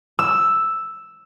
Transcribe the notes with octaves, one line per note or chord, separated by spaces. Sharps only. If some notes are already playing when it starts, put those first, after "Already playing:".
E6